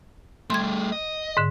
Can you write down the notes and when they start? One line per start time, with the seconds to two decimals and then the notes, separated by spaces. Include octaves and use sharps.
0.50 G3 A3 C6 G#6
0.92 D#5
1.37 G#2 D3